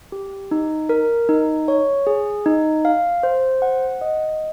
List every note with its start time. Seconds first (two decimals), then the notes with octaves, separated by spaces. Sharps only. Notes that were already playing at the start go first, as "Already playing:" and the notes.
0.12 G4
0.51 D#4
0.89 A#4
1.29 D#4
1.68 C#5
2.07 G#4
2.46 D#4
2.85 F5
3.23 C5
3.62 F#5
4.01 D#5